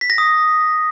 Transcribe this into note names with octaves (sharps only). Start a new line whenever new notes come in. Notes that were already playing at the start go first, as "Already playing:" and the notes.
B6
A#6
D#6